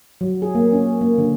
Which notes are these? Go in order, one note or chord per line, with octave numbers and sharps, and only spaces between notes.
F#3
G#4
A#3
C#4
A#3
D3